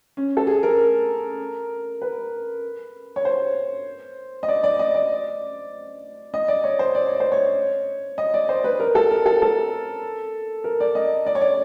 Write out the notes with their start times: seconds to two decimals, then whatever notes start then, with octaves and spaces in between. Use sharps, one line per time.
0.17 C#4
0.37 A4
0.47 G#4
0.63 A#4
2.01 B4
3.16 C#5
3.25 C5
4.43 D#5
4.48 D5
4.63 D5
4.79 D#5
4.95 D5
6.34 D#5
6.48 D5
6.64 C#5
6.79 C5
6.95 D5
7.07 C#5
7.20 C5
7.32 C#5
8.18 D#5
8.34 D5
8.49 C5
8.64 B4
8.80 A#4
8.95 A4
9.11 A#4
9.26 A4
9.42 A4
10.64 A#4
10.80 D5
10.95 D#5
11.26 D5
11.35 C#5
11.41 D5